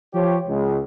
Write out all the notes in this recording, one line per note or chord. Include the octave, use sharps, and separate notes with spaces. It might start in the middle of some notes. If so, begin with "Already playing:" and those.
F3 G4 C#5
C#2